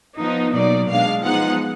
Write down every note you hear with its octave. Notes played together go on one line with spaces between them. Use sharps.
F3 B3 D#4
B2 F#3 A#3 D#4 D5
B2 G#3 D4 F5
F3 G#3 B3 D#4 F#5